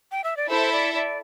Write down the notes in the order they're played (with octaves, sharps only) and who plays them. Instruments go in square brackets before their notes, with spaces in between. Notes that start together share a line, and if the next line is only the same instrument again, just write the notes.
[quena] G5
E5
D5
[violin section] E4 A4 E5 [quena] C5
[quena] D5
D5